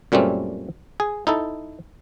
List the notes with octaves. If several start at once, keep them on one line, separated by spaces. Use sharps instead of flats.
F#2 A#2 G3 A3 C4 C#4
G#4
D#4 E4 A4